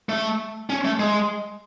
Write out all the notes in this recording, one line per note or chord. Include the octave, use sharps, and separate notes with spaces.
A3
C#4
A3
G#3